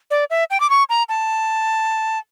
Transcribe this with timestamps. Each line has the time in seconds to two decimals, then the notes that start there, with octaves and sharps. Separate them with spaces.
0.11 D5
0.30 E5
0.50 G5
0.60 D6
0.70 C#6
0.89 A#5
1.09 A5